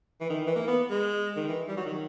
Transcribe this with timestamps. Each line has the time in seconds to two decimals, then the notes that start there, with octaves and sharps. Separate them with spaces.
0.21 E3
0.30 D#3
0.47 E3
0.56 A#3
0.67 B3
0.90 G#3
1.36 D#3
1.48 E3
1.68 G3
1.77 F#3
1.86 D#3